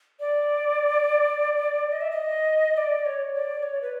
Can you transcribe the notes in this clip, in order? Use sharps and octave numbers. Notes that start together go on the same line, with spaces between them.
D5
D#5
E5
D#5
D5
C#5
D5
C#5
B4